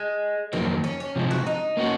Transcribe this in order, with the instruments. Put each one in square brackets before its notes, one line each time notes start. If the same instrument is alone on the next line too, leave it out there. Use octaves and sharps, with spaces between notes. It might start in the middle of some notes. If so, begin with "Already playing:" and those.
Already playing: [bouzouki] G#3
[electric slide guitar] F2 D#3 F#3 A#3 [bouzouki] C4
[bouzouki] C#4
C#4
[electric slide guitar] C3 F3 G#3
[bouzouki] F#4
D#4
[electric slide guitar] A#3 C#4 F#4